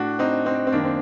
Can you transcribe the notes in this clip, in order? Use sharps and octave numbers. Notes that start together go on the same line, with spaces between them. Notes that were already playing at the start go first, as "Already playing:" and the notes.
Already playing: A2 D4 F#4
C4 D#4
C4 D#4
C4
F#2 D#3 A#3 D4
C4